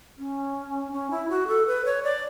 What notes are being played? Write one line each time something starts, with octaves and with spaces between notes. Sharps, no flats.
C#4
C#4
E4
F#4
A4
B4
C#5
D5